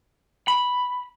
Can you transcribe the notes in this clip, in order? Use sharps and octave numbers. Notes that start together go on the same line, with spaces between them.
B5